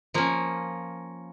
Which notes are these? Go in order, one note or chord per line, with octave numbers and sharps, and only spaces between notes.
F3 A#3 C#4